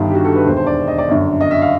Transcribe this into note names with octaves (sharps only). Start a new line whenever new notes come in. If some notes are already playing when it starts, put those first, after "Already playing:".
Already playing: G1 G2 D#3
G4
F#4
A4
B4
E1 D#2 D3 C5
C5
D5
D#5
D5
G1 F#2 D3
D#5
E5
F5